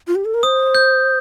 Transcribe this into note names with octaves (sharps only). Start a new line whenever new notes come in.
F4
G4
A4
A#4
C5 D#6
G6